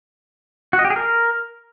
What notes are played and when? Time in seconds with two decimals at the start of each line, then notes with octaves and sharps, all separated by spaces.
0.73 F#4
0.79 D#5
0.85 G4
0.90 G#4
0.96 A#4